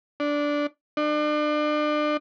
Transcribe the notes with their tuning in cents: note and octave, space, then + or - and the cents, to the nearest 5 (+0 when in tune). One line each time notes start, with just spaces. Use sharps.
D4 -10
D4 +35